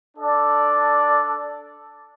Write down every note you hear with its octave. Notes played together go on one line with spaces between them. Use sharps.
D4 A4 D5